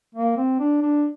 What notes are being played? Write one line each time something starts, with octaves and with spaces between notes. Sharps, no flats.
A#3
C4
D4
D4